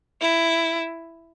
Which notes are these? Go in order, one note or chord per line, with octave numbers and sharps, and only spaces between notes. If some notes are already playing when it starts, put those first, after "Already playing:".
E4